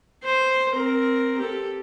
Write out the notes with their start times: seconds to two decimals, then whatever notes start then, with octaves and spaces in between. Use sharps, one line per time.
0.24 C5
0.73 C4 A#4
1.38 G4 A4